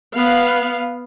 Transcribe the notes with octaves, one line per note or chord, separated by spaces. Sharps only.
B3 F5